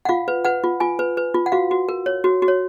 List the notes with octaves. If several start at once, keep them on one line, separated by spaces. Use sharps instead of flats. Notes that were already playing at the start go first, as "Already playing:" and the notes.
F#5
F4 F5
B4
B4 F#5
F4
F4 G#5
B4
B4
F4
F#5
F#4 F5
F#4
A#4
C#5
F#4
F#4
C#5